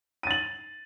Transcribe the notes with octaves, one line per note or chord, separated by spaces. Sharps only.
A6 D#7 F#7